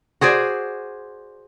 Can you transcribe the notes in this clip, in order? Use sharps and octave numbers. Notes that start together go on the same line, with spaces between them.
F#4 G#4 C5 D5